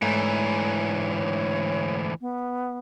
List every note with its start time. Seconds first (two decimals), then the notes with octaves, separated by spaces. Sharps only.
0.02 D2 G#2 E3 A3 C#5
1.15 C#5
2.21 B3